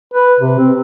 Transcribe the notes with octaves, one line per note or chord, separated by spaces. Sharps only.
B4
C3
C4